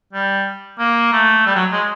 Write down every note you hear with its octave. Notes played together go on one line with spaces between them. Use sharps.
G3
A#3
A3
G3
F#3
G#3